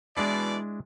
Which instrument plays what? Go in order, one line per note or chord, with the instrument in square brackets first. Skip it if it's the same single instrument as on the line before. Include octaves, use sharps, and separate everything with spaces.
[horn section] B2 E3 D5 [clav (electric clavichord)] G#3 D4 E4